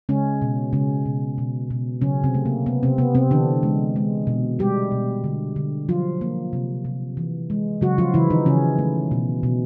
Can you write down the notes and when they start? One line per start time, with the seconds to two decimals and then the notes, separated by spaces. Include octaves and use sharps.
0.09 C#3 G#3 C#4
0.42 B2
0.73 C#3 G#3 C#4
1.06 B2
1.38 B2
1.70 B2
2.01 C#3 F#3 C#4
2.24 C3 C4
2.34 A3
2.46 A#3
2.66 C3 B3
2.83 C3 C4
2.98 C3 B3
3.15 C3 C4
3.31 D3 E3 D4
3.63 G#3
3.96 G#3
4.27 B2
4.59 G3 G#3 G4
4.91 B2
5.24 D3
5.56 D3
5.89 F3 F#3 F4
6.21 A#3
6.53 C3
6.85 C3
7.17 E3
7.50 G#3
7.81 C#3 F#3 F#4
7.98 F3 F4
8.14 C#3 E3 E4
8.30 D#3 D#4
8.46 C#3 E3 C#4
8.78 A3
9.11 B2
9.43 B2